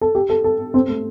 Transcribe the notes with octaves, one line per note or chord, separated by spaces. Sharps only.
A4
G4
A4
A4
C4
A3